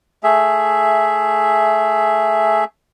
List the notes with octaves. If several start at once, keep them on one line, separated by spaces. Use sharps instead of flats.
A3 G#4 E5